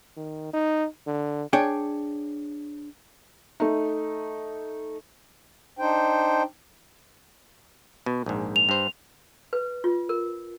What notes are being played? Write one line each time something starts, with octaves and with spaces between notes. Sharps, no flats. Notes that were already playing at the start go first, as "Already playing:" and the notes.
D#3
D#4
D3
D4 G#4 C#5 G5
A3 D#4
D4 D#4 C5 G5
B2
A#1 G#2
F7
G2 C5
B4
F4
A#4